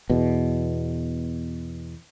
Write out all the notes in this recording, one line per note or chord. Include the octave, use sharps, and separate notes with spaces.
E2 B2